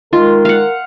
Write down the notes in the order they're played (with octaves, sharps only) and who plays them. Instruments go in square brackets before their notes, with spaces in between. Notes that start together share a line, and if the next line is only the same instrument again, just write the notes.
[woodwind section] D#3 G#3 [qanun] F4 [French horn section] A#4
[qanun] F5 F#5